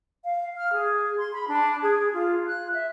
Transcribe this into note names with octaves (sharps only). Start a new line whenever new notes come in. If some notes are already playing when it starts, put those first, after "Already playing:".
F5
F6
G#4
C6
B5
D4
G#4
F4
F#6
E5